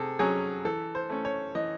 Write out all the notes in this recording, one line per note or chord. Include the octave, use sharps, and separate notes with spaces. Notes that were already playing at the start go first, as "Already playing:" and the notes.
Already playing: C3 G#4 A4
F#3 C#4 G#4
E3 A4
C5
A3 C#4
C#5
E3 D#5